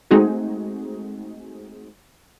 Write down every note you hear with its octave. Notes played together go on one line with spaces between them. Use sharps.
G#3 A3 C4 D#4 F#4 G#4